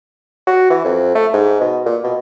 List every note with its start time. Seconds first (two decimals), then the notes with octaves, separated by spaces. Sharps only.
0.47 F#4
0.70 E3
0.85 F2
1.15 A3
1.33 G#2
1.61 B2
1.86 A#2
2.03 B2